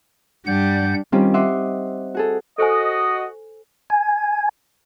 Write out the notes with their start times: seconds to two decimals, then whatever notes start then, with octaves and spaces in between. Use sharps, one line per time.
0.46 G2 G3 D4 F#5 G6
1.12 D#3 G3 C4 C#4 F4 G4
1.34 D#5 E5 F#5 C6 D6
2.15 F#4 G#4 A4
2.58 F#4 A4 C5 D#5 G#5
3.90 G#5